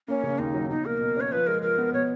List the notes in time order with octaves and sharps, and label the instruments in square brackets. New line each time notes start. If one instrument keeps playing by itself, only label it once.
[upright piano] A#3 [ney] C#4
[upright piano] C#3
[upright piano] D#2 [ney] D#4
[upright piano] F#3
[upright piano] B2 [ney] D#4
[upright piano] A#3 [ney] A#4
[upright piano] B2
[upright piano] C#4 [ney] C#5
[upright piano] F3 [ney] B4
[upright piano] G#3 [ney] A#4
[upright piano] F3 [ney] A#4
[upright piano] B3
[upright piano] B2 [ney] C#5